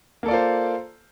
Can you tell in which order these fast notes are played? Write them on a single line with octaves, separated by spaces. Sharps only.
A#3 A4 D5 F4 C5